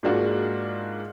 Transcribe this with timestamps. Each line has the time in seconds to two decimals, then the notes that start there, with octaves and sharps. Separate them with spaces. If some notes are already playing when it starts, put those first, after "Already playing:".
0.03 G#2 G#3 A#3 D4 F4 F#4